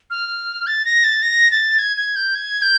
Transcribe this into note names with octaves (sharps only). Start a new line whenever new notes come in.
F6
A6
A#6
A6
A#6
A6
G#6
G#6
G6
G#6
G6